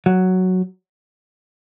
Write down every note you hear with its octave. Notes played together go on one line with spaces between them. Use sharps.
F#3